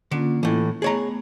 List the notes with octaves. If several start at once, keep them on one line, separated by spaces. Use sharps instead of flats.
D3 A#3 C#4 F4
A2 E3
A3 B3 G#4 C#5 A#5